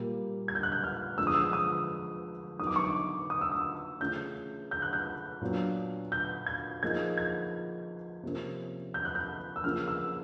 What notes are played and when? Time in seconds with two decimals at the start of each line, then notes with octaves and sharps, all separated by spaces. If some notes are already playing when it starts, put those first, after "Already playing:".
Already playing: A#2 G3 A#3
0.48 G#6
0.55 G6
0.63 F#6
0.72 G6
0.84 F6
1.18 D3 F3 G#3 B3 D4 E6
1.27 D#6
1.34 E6
1.53 D#6
2.59 D#3 F#3 B3 D#4 D#6
2.67 D6
2.76 C#6
2.84 D6
3.30 D#6
3.41 E6
3.52 D#6
4.00 C#3 E3 A3 C#4 F4 G6
4.71 G6
4.82 F#6
4.93 G6
5.41 A#2 F#3 B3 D4
6.12 G6
6.46 G#6
6.82 F3 A#3 D#4 G#4 G#6
7.18 G#6
8.23 C3 F3 A#3 C#4
8.94 G6
9.05 F#6
9.15 G6
9.56 E6
9.64 C#3 F3 A#3 C#4 F4 F6
9.88 E6